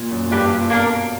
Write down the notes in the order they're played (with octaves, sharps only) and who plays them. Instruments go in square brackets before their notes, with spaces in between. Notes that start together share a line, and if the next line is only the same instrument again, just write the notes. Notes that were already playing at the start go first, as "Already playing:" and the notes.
Already playing: [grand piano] A#2
F#2
A#2
[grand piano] G2 [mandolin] D4 G4 B4
[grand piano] G2
A#2
[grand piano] B2 [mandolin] A#3 D4 A#4